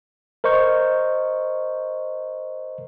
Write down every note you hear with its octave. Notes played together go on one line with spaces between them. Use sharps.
A#4 C5 D#5 C#6 G6